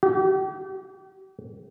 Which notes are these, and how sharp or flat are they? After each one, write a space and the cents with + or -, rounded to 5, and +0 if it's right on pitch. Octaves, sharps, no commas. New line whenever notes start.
G4 -40